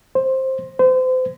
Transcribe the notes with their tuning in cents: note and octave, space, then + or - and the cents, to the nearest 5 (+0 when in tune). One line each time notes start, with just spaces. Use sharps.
C5 +10
C5 -35